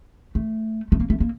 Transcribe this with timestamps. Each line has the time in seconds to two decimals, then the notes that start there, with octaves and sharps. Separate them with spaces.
0.35 A3
0.92 A3
1.00 A#3
1.10 A3
1.20 A#3